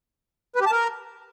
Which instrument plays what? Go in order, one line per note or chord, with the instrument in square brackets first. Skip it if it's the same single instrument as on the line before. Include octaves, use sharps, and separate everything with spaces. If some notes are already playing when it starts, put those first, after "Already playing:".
[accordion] B4
G4
A5
A#4